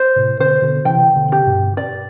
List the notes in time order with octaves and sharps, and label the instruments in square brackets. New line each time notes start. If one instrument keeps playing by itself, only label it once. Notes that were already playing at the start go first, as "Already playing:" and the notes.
Already playing: [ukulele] C5
[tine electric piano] A2 C3
[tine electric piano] B2 D3 [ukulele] C5
[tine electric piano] B2 D3
[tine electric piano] C3 E3 [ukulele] G5
[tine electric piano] B2 D3
[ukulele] G4
[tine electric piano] C3
G2 B2
[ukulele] D5